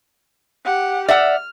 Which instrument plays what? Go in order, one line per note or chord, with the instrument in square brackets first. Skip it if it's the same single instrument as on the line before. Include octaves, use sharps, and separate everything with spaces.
[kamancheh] G4 F#5
[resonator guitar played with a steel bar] D5 E5 F#5 [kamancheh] F6